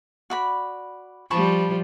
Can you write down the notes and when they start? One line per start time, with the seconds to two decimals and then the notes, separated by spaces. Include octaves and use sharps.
0.30 F#4 D5 B5
1.31 F3 G3 A5 B5 C#6